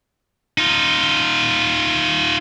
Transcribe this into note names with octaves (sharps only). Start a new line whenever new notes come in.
D#4 F4